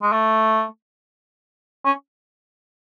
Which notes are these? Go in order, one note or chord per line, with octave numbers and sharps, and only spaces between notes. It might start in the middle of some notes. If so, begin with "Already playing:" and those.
G#3
A3
C#4